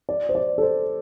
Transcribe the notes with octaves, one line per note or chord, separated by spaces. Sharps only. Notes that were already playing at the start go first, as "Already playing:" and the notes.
D5
C5
D5
A4
C5